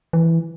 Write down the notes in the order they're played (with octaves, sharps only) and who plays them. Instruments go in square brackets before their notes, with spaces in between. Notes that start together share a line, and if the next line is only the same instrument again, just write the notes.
[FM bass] E3